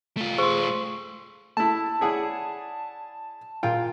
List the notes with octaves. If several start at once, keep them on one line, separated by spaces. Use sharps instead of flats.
A3 F4
G#4 C6 C#6
A3 E4 A5
E4 G#4 C#5 D5 F#5
A#2 A#3 F4 G5